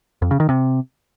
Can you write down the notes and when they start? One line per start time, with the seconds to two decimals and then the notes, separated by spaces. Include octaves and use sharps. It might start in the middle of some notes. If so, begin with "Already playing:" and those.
0.22 F2
0.31 C#3
0.40 D#3
0.49 C3